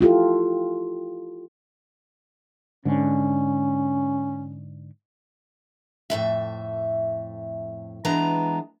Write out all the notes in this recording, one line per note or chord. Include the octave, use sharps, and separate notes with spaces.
E4 F4 G4 A4
G#2 D3 C#4
F2 A2 G#3 E5
E3 G#3 B3 D4 A#5